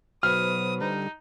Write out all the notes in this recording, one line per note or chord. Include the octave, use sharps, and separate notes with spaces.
B2 F#3 B4 C5 B5 D#6 F6
D3 G3 D#4